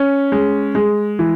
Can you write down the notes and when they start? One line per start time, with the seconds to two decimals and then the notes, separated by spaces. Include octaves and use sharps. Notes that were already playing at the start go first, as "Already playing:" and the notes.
Already playing: C#4
0.32 G#3
0.75 G#3
1.19 E3